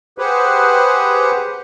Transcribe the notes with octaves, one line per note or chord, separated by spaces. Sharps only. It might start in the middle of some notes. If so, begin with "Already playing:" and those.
G4 G#4 B4 C5 F#5